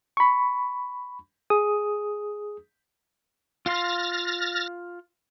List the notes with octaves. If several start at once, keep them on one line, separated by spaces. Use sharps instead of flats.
B5 C#6
G#4 D#6
F4 F5 C6 F6 A6 A#6